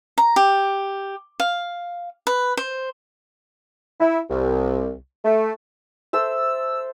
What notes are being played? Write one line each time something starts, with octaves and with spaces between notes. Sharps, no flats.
A#5
G4
F5
B4
C5
E4
C2
A3
A4 C5 E5 E6